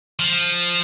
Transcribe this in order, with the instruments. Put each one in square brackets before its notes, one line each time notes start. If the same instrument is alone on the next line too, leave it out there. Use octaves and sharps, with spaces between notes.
[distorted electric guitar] F3